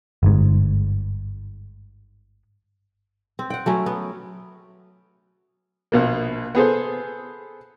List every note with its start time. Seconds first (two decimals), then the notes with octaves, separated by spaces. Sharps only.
0.23 G1 G#2
3.39 C4
3.50 F#5 G5
3.66 F#3 A3 C#4
3.86 B3
5.92 A#1 B2 A#3
6.55 B3 G#4 A4 C5